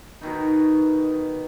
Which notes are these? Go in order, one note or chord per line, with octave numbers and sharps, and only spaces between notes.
B2 D#3 D#4